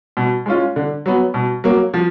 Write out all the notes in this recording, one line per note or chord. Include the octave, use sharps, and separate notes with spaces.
B2
G#3 C#4 F4
D3
F#3 B3
B2
F#3 A#3
F3